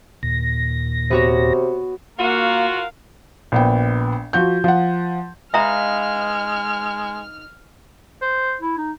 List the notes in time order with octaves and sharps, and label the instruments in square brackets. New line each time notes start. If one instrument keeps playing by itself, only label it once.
[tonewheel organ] D#2 A#2 A#6
[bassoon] C3 [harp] B3 F#4 C#5
[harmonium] A#3 [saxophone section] F4 F#4 [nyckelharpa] A#4 F5
[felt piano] A#1 B3 G5
F3 F#4 G6
F3 F#5
[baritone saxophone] G#3 [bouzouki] D#4 B4 F5 [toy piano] E5 A#5 [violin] F6
[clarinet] C5
E4
D#4